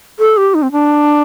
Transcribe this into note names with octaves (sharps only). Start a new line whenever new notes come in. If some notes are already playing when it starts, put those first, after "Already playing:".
A4
G4
D#4
C4
D4